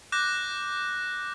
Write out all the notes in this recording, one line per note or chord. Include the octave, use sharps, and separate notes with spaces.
D6 F#6 G6 A#6